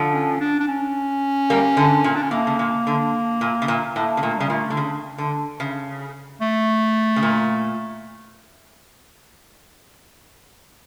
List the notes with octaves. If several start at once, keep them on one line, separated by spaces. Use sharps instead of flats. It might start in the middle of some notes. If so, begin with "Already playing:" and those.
Already playing: D3 F3
C#4
D4
D4
C#4
G3 A#3
D3
A#2
D4
C#4
A2 A#3
C#3
A#2
D3
A#2
C#3
A#2
A2 A#3
C#3
A#2 A3
C#3 G3
A#2 A3
D3
C#3
D3
C#3
A3
C#3
A#2